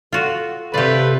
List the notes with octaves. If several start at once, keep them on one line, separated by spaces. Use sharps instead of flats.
F4 F#4 A4
C3 A3 F4 G4 A4 B4 D5